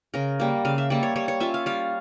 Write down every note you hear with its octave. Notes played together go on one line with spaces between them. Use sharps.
C#3 A#4
G3 A#3
C#3 F5
E5
G3 A#3 D5
C#5
G3 C#5
C#5
C#4 F4 E5
F5
G3 F5